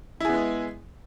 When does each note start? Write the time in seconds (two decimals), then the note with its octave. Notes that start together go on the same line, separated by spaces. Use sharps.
0.20 E4
0.25 G#4
0.29 B3
0.33 G#3